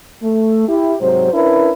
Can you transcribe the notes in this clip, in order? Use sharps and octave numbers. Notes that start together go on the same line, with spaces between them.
A3
E4 G4
G#2 C3 F#3 C5
C#4 D4 E4 A#4 B4